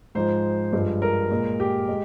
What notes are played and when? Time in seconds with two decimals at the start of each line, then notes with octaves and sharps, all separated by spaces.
0.15 G#2 F3 G#3 C5
0.73 G2 F3 G#3
1.02 A#4
1.31 A#2 G#3
1.60 G4
1.88 G#3